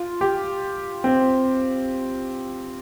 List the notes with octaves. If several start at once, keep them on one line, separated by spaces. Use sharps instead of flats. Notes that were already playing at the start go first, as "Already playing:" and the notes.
Already playing: F4
G4
C4